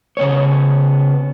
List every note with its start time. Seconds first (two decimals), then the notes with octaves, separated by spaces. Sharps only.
0.17 C#3 B3 C#5